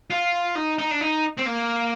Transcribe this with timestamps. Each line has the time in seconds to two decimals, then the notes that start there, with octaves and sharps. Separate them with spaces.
0.10 F4
0.55 D#4
0.78 D#4
0.91 D4
1.01 D#4
1.38 C4
1.46 A#3